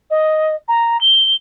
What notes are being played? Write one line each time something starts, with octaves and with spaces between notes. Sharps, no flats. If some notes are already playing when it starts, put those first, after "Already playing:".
D#5
A#5
G7